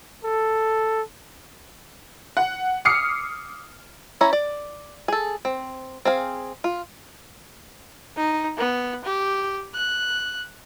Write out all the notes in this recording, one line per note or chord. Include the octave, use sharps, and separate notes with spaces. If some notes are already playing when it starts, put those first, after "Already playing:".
A4
F#5
D6 D#6 F6 C7 C#7
C#4 E4 C#5 A#5
D5
G#4 A4
C4
C4 G#4 F5
F4
D#4
B3
G4
F#6